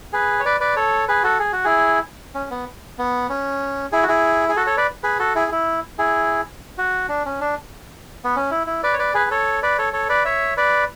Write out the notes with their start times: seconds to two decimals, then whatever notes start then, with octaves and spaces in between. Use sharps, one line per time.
0.13 G#4 B4
0.40 C#5
0.46 B4 D5
0.60 B4 D5
0.76 A4 C#5
1.08 G#4 B4
1.23 F#4 A4
1.39 G#4
1.53 F#4
1.65 E4 G#4
2.34 C#4
2.51 B3
2.99 B3
3.29 C#4
3.92 E4 G#4
4.03 F#4
4.08 E4 G#4
4.49 G#4
4.56 F#4 A4
4.66 A4 C#5
4.77 B4 D5
5.03 G#4 B4
5.19 F#4 A4
5.35 E4 G#4
5.52 E4
5.98 E4 G#4
6.78 F#4
7.09 D4
7.26 C#4
7.41 D4
8.24 B3
8.36 C#4
8.51 E4
8.67 E4
8.83 B4 D5
8.93 C#5
8.99 B4 D5
9.14 G#4 B4
9.31 A4 C#5
9.63 B4 D5
9.78 A4 C#5
9.93 A4 C#5
10.09 B4 D5
10.25 C#5 E5
10.57 B4 D5